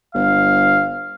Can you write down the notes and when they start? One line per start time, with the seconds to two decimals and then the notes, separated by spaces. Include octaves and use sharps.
0.15 G1 F5